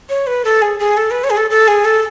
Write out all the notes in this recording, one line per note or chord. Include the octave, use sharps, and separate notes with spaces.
C#5
B4
A4
G#4
G#4
A4
B4
C#5
G#4
A4
A4
G#4
A4